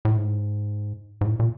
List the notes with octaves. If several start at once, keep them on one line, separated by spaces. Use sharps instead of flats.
A2
G#2
G#2
A2
A#2